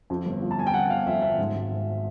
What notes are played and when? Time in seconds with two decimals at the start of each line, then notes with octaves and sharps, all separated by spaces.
0.10 F2
0.26 G1
0.42 F3
0.51 A5
0.58 G1 G#5
0.67 G5
0.74 G1 F#5
0.90 G1 F5
1.06 F2 E5
1.22 G1 E5
1.38 G#2
1.55 G#1
1.71 G#2